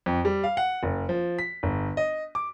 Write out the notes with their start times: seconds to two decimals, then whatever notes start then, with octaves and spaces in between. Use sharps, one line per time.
0.06 F2
0.25 G3
0.44 F5
0.57 F#5
0.83 F#1
1.09 F3
1.39 B6
1.63 G1
1.97 D#5
2.35 D6